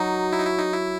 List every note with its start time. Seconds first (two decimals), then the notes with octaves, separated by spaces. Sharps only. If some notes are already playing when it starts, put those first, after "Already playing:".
Already playing: F#3 D#4
0.32 E4
0.40 D#4
0.46 E4
0.59 D#4
0.73 E4